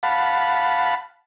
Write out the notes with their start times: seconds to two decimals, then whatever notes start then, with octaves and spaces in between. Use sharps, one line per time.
0.03 F5 F#5 A5 B5